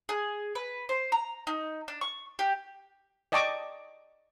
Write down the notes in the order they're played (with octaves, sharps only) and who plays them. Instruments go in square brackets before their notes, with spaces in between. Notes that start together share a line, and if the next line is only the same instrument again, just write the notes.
[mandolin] G#4
B4
C5
A#5
D#4
D4
C#6
G4
[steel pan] D5 D#5 G5 A5 C#6 D6